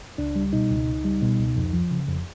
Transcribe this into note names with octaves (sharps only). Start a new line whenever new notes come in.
C#2 D4
G3
B2 D#4
C#2
C#2
G3
B2
C#2
F2
F3
C#3
F2